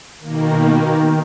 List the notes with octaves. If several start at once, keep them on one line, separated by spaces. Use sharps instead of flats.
B2 D#3 A#3